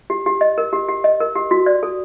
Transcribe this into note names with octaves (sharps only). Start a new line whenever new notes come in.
G4
G4
D#5
A#4
G4
G4
D#5
A#4
G4
F#4
D5
A4